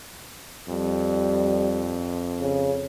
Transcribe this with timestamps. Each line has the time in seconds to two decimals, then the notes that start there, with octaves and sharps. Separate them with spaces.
0.69 F2 G3
2.41 C#3